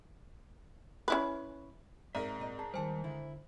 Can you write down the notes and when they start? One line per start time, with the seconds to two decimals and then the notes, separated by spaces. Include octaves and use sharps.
1.08 C#4 E4 B4
2.15 G#2 C4 A#4 D5 E5
2.40 A#2 D#5
2.59 G#4 A5
2.74 D#2 D#3 G3 C5 G#5 A5
3.04 D3 E4